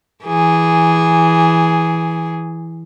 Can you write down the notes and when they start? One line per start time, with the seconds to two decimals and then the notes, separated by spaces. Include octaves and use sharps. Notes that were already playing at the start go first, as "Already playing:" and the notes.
0.24 E3 G#4